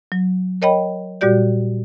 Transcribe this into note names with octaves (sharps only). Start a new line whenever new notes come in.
F#3
A#4 C#5 D#5 G5 B5
A#2 G3 F#4 G4 D5 G6